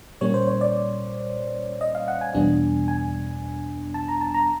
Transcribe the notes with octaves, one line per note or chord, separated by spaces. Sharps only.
A#2 G3 A#3 C#4 C#5
C5
C#5
D5
D#5
F5
F#5
G#5
E2 B2 G3 B3 D4
G#5
A5
A#5
A5
A#5